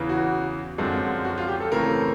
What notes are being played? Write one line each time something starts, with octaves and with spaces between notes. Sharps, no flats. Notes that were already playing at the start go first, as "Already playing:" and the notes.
Already playing: E2 C#3 E3
F#4
F#2 D3 F3 G#3 C4
F#4
F4
G4
A4
C#3 E3 A3 C4 A#4